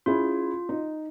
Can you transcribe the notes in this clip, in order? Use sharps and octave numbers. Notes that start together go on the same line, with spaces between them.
C#4 E4 F4 G#4
D#4